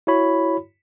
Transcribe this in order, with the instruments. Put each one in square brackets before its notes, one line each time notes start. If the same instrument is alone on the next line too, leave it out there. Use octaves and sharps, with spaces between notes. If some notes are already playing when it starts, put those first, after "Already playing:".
[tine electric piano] E4 F#4 C#5 B5